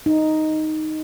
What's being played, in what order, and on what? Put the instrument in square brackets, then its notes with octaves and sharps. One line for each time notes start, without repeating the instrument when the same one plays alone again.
[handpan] D#4